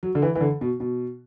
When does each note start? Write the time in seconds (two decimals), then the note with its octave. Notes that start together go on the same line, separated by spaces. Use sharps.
0.03 F#3
0.15 D3
0.22 E3
0.35 E3
0.41 D3
0.61 B2
0.80 B2